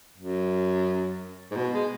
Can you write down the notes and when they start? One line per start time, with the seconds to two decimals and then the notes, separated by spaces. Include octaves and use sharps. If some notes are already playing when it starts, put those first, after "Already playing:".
0.18 F#2
1.51 G#2
1.56 B2
1.73 G#3